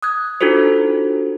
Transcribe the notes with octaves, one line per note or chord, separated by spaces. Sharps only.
D#6 F#6 G#6
D4 D#4 F4 F#4 A4 C5